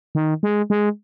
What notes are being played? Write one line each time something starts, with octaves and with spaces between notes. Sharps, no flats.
D#3
G#3
G#3